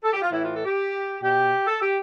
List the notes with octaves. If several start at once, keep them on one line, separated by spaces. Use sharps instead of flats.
A4
G4
F4
A2 E3 E4
F4
A4
G4
B2 G4
A4
G4